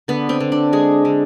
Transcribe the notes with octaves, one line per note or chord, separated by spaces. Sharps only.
D3 B3
C4
D3
D4
G#3 G#4
D3